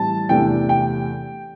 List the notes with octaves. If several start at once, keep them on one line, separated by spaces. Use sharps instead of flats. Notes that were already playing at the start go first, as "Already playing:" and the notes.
Already playing: A2 E3 G3 C4 A5
E2 C3 A3 D4 G5
G5